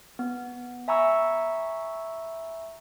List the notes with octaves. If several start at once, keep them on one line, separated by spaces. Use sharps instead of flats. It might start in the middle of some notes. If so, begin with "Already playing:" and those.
B3
E5 G#5 A#5 B5 C#6 E6